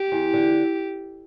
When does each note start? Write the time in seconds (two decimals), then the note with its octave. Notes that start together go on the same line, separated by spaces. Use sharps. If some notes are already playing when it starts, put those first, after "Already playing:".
Already playing: G4
0.12 E2
0.34 D3